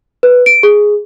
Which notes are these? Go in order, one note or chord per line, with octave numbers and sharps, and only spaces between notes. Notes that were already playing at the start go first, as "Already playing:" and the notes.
B4
D7
G#4